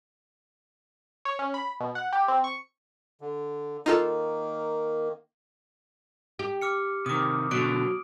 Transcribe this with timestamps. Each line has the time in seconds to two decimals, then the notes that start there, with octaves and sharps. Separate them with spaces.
1.25 C#5
1.39 C#4
1.54 B5
1.80 B2
1.95 F#5
2.13 G4
2.28 C4
2.44 C#6
3.21 D3
3.86 D#3 A#3 D#4 F4 A4
6.39 G4
6.62 D6 F6 C#7
7.06 C3 D#3 D6 D#6
7.51 B2 D3 F#3 D7